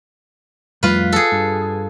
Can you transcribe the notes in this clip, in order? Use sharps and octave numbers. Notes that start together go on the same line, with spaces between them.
F2 G3 A3 F4 B4
G#4 A4
G2